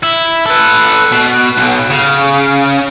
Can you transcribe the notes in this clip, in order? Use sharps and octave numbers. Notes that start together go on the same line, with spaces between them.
E4
A4 B4
B2
B1 B2
C#3